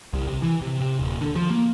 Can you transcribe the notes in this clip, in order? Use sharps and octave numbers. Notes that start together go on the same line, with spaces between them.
C2
C3
E3
C3
C3
D#1
D3
F3
A#3